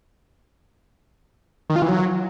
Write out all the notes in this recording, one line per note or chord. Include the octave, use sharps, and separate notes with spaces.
D#3
F4
E3
F#3